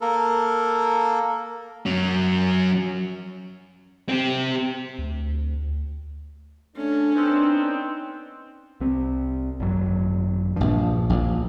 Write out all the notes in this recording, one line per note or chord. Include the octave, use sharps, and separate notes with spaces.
A#3 A4 A#4
F#3 C#4
C4 G4
D2
A3 C#4 D4
B3 C4 D#4
C2 C4
G#1 F#2 F#3
A#1 G2 F3
A#1